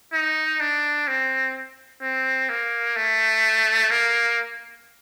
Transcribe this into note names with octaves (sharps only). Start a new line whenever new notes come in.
D#4
D4
C4
C4
A#3
A3
A#3